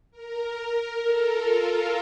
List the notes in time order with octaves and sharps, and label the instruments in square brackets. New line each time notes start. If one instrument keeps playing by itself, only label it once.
[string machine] A#4
A4
F4
F4